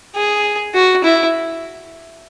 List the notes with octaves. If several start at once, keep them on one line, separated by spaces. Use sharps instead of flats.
G#4
F#4
E4